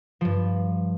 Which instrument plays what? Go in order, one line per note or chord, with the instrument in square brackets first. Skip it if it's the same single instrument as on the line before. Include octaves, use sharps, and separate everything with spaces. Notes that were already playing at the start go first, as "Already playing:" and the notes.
[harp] G2 F3